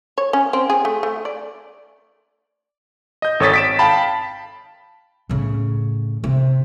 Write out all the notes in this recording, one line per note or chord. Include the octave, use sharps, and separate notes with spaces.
C#5
C#4
C4
G#4
A3
A3
D5
D#5 G6
G#1 A4 C#5 D#6 A6 B6
B6 D7 E7
F5 G5 A5 B5 B6
A2 C#3
C3